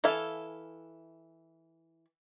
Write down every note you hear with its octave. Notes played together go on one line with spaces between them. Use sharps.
E3 A4 E5 F5 G#5